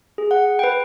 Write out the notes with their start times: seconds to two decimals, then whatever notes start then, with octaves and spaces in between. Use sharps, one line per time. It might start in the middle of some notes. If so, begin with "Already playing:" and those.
0.18 G#4
0.31 F#5
0.59 B4 G5